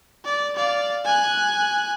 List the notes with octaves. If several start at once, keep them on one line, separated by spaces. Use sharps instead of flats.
D5
D5 F5
G#5 F#6